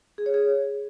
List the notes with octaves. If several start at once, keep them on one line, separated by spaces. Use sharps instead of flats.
G#4
C#5
G#4